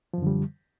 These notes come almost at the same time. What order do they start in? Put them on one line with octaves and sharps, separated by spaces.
F3 F#2 D3 G3